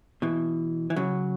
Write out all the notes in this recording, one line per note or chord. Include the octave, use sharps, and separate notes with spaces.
B2 E3
E3
C#3 F#3